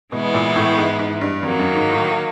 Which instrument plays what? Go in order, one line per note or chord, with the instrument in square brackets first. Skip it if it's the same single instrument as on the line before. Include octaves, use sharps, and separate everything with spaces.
[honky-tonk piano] B2 [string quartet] E3 G#3 B3 E4
[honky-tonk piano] A#2
A2
G#2
G#2
G2
[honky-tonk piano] F2 [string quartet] D#3 F#3 A#3
[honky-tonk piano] F#2
G#2
A2